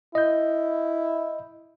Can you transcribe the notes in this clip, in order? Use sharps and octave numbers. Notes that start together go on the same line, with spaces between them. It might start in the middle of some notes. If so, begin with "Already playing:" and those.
E4 D#5 G6